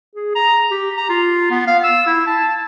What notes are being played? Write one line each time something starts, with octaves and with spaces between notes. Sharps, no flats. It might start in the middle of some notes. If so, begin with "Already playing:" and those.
G#4
A#5
G4
A#5
F4
B3
F5
E6
E4
A5